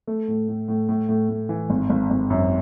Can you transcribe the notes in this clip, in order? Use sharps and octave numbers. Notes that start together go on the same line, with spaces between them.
A3
A2
A2
A2
A2
A2
A2
E3
G#1
G#1
G#1
F#2